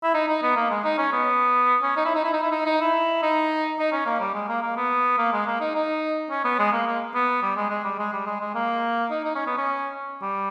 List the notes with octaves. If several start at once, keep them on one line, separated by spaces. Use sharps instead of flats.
E4
D#4
D#4
B3
A#3
G#3
D#4
C#4
B3
C#4
D#4
E4
D#4
E4
D#4
E4
D#4
D#4
E4
D#4
D#4
C#4
A#3
G3
G#3
A#3
A#3
B3
A#3
G#3
A#3
D#4
D#4
C#4
B3
G#3
A#3
A#3
B3
G3
G#3
G#3
G3
G#3
G3
G#3
G#3
A#3
D#4
D#4
C#4
B3
C#4
G3